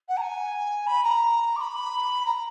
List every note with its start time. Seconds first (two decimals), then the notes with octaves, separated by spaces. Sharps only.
0.08 F#5
0.17 A#5
0.21 G#5
0.86 B5
1.03 A#5
1.56 D6
1.60 B5
2.25 A#5